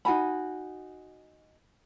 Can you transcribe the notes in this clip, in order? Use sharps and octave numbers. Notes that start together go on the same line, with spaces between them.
D#4 F#4 G#5 B5